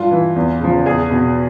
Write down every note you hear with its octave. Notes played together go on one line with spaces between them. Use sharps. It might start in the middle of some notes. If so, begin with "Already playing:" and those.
Already playing: G2 F4
E3
E2
C#3 F3
E2 G#4
B2